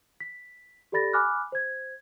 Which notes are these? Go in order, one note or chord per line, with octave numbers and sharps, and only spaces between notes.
B6
G4 A4 D5 B5 A6 A#6
G#5 B5 D6 F6 F#6
C5 G#6